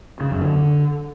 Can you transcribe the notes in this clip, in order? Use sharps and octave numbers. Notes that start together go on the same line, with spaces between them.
C#3
F#2
D3